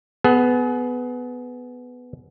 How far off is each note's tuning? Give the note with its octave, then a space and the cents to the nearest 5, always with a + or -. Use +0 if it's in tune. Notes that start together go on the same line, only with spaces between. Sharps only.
B3 +10 G#4 +30